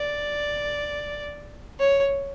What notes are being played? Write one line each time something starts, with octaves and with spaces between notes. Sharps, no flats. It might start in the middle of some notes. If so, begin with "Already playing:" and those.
Already playing: D5
C#5